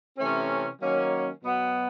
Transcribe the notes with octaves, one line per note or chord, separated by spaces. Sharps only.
C3 E3 A3 C#4
D#3 F#3 A#3 C#4
B2 F#3 B3